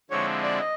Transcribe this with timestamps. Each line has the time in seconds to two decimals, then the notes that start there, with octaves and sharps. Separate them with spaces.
0.10 D3 F3 G#3 C4 E4 C#5
0.43 D5
0.60 D#5